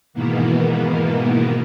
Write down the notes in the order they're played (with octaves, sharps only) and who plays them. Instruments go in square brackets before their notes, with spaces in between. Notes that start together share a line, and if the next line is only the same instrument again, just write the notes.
[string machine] G#2 B2 D#3 E3 A#3 B3